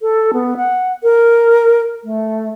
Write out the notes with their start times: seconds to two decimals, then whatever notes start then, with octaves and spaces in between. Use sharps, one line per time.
0.01 A4
0.33 B3
0.57 F#5
1.03 A#4
2.04 A3